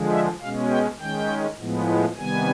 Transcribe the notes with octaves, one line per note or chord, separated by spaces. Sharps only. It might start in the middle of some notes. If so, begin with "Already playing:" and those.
Already playing: D3 F3 G#3
E5
B2 G#3 C#4 F5
G5
D#3 G#3 C#4 G5
A2 F3 G#3 B3
C3 D#3 G3 B3 G#5